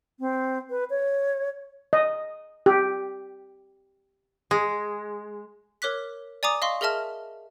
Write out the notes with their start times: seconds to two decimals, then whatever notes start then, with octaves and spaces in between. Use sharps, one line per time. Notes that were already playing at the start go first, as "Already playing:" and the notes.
0.19 C4
0.70 B4
0.90 C#5
1.93 D#5
2.66 G4
4.51 G#3
5.82 A#4 C#5 D6 F#6 B6
6.43 D5 G#5 A#5 D6 D#6
6.62 D#5 F5 C6 C#6
6.81 G#4 A#4 D#5 E5 A5 F6